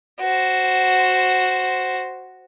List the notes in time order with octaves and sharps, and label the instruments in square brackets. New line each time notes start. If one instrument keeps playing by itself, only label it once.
[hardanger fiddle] F#4 C5